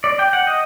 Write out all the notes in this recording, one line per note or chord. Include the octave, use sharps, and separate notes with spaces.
D5
G5
F#5
D#5